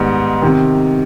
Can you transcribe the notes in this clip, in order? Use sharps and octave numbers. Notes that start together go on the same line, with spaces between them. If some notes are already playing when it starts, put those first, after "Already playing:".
Already playing: G#2 D#3 G3 B3 D#4
C3 D#3